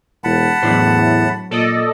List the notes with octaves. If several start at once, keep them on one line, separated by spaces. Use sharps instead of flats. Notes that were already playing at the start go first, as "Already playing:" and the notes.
E1 F#5 A5 B5
E2 A2 F#3 D4 C5
A#2 A4 D5 D#5